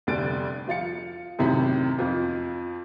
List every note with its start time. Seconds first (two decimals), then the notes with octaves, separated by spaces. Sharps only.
0.07 F1 D2 G3 A6 D7
0.68 F3 F4 A6 C#7
1.39 F#2 A2 C3 D#3 E4
1.98 F2 F3 D#4